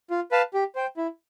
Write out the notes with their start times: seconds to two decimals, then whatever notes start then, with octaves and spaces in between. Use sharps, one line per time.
0.10 F4
0.31 B4 F5 A5
0.54 G4
0.75 C5 G5
0.97 E4